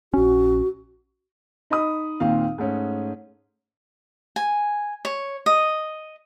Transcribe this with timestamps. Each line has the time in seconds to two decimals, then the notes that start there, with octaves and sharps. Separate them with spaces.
0.14 A#1 C#4 F#4
1.70 D#4 D#5 B5 D#6
2.20 D#2 A#2 D#3 C4 F5
2.58 G#2 A3 C#4
4.36 G#5
5.05 C#5
5.46 D#5